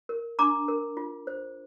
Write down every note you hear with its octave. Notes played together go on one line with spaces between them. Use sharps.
A#4
D4 A#5 D6
A#4
F4
C5